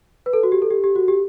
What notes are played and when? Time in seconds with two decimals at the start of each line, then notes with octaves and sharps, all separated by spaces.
0.26 B4
0.33 A4
0.43 F#4
0.52 G4
0.62 A4
0.71 G4
0.84 G4
0.96 F#4
1.08 G4